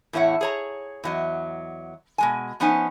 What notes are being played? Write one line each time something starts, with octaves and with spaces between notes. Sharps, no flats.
E2 A2 E4 C#5 F#5
G#4 C#5 A#5
E2 F#3 D#5
B2 G#3 G#5
F3 B3 C#4 D#4 C5 G#5